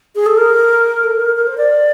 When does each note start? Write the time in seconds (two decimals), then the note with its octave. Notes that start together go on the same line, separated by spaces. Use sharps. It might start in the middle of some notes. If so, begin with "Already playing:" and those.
0.15 G#4
0.26 A4
0.37 A#4
1.03 A4
1.19 A#4
1.36 A#4
1.47 C5
1.58 D5